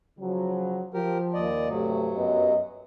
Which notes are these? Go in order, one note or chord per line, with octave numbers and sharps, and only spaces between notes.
C#3 F3 F#3
F3 G4 A#4
D#2 D5 D#5
G2 C3 F#3 A3
F#2 B3 D#5